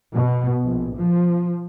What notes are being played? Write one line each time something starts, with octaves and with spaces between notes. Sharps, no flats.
B2
A#1
F3